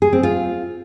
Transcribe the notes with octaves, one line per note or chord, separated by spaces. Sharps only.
G#4
C4
F4